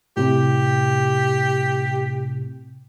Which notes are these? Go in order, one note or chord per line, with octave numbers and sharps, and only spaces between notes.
A2 C3 G4